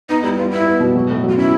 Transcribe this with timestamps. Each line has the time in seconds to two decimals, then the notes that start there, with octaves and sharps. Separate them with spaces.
0.09 B3 D#4
0.23 G3 E4
0.37 B3 F4
0.52 B3 E4
0.66 B3
0.80 B2
0.95 F#3
1.10 A2
1.24 F#3
1.29 F4
1.37 C#4 E4